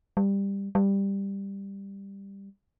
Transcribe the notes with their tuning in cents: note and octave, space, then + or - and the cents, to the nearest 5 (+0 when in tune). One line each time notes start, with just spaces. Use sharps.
G3 +15
G3 +10